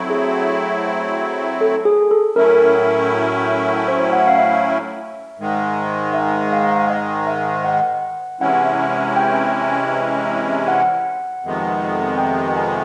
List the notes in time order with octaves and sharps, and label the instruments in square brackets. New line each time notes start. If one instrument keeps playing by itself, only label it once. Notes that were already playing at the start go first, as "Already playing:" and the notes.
Already playing: [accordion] F#3 A3 C4 E4
[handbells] G#4
A4
G#4
A4
[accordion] A2 F#3 A3 C#4 E4 [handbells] A#4
[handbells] C5
F#5
F5
E5
[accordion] G#2 D#3 G#3
[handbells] E5
F5
D#5
E5
F#5
[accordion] C3 E3 G#3 C#4 E4 [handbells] F#5
[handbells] G5
F#5
[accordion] F2 C3 D#3 G#3 B3
[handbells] G5
G#5